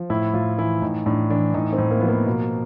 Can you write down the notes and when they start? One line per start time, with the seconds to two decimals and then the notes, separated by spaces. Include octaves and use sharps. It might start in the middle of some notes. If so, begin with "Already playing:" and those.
Already playing: F3
0.10 A2 E4
0.34 A2 F4
0.58 E3 E4
0.82 A2 D#4
1.06 A2 D4
1.30 E3 D4
1.54 A2 D#4
1.72 C4
1.78 A2
1.91 A#3
2.00 F3 B3
2.09 A#3
2.26 B2